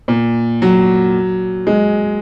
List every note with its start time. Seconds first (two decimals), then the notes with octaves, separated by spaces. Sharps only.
0.08 A#2
0.62 F#3
1.67 G#3